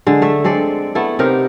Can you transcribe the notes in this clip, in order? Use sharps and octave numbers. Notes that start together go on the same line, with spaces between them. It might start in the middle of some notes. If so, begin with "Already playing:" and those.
D3 G#3
A3 E5
G#3 C4 A4 D5
A3 B3 E4 A4
C3 D#4 G4 A#4